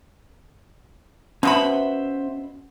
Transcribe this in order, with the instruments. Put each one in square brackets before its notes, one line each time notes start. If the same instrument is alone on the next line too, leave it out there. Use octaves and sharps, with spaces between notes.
[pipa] B2 B3 B5 [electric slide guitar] C#4 C5 E5